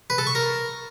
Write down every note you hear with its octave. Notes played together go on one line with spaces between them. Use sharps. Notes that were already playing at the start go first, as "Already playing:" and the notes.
B4
A4
C#6
A#4